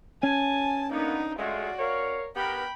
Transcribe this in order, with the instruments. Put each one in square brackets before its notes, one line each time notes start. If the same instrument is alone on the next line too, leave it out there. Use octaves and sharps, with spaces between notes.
[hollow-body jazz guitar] C#4 [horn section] G#5 [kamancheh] A5
[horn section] A#3 B3 [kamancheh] D4 D#4
[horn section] G#3 A3 F4 [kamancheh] F#4 D5
[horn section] A#4 C#5 F5
[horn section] B3 G4 A#4 [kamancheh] G5 B5